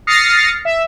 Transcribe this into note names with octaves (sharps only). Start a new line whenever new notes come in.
D#6 F6 A6 A#6 C7 C#7
E5